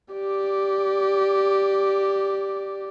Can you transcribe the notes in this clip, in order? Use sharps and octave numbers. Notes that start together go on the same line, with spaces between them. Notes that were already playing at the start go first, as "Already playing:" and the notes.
G4 D5